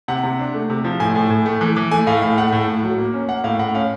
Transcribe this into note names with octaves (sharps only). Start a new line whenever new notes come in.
C3 F#5
C3
D4
A3
C3
F3
A2 G#5
A2
A2
A3
E3
E3
A3 G#5
A2 F5
A2 F5
A3 F#5
A2
A2
F#3
A#3
C#4
A#3 F#5
A2 F5
A2 F#5
C#4 F5